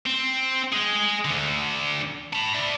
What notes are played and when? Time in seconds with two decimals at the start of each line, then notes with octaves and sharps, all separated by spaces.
0.06 C4
0.73 G#3 G#4
1.25 D2 D3
2.33 A5 B5
2.55 D5 E5